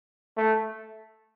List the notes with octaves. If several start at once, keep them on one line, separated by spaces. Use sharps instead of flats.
A3